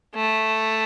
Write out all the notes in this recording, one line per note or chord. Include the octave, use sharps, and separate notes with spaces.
A3